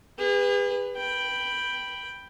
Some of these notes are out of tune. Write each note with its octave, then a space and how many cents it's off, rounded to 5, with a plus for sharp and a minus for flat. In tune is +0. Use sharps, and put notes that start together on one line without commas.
G#4 -45 B4 +0
G5 +0 B5 +0